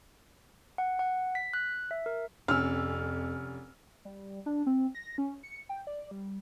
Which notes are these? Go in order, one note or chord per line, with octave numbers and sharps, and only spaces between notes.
F#5
F#5
B6
F#6
E5
A#4
F1 F2 C#4 E6 F6
G3
D4
C4
A#6
C#4
C#7
G5
D5
G3